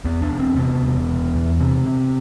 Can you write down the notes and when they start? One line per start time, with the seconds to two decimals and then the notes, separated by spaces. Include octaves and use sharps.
0.05 E2 B3
0.22 D4
0.30 E1
0.40 C4
0.56 C3 B3
0.82 E1
1.09 E1
1.35 E2
1.60 C3 C4
1.86 C3